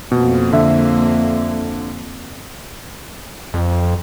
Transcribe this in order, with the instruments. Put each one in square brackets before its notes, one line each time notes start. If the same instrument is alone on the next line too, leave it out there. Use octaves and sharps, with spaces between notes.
[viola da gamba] F2 A#3 [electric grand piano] B2
[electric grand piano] D3 E5
[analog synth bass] F2